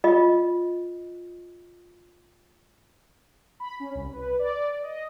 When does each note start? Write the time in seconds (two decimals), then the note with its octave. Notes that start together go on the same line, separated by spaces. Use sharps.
0.04 F4 D#5
3.60 B5
3.80 C#4
3.95 C2
4.12 B4
4.39 D5
4.83 D#5